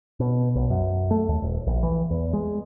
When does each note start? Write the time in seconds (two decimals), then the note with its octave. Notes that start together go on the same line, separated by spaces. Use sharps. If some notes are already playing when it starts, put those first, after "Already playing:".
0.20 B2
0.55 B1
0.70 F#2
1.11 A3
1.29 D#2
1.42 D#1
1.67 A#1
1.83 E3
2.10 E2
2.33 G#3